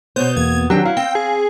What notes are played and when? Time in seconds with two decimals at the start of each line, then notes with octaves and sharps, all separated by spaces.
0.16 B2 B3 C5 C#5 G6
0.36 E2 A#3 G#6
0.70 D#3 F#3 C4 D4 G4 G5
0.86 E4 F5
0.97 C4 G5
1.15 G#4